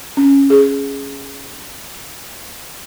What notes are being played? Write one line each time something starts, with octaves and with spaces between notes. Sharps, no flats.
C#4
G#4